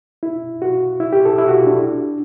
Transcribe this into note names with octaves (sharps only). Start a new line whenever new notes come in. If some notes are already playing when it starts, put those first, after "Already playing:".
E4
F#4
E4
G4
A4
E4
F#4
D4